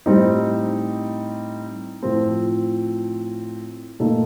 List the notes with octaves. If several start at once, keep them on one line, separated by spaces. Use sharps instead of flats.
A2 G3 C4 D#4 G4
A2 F3 C4
A#2 A3 D#4 A4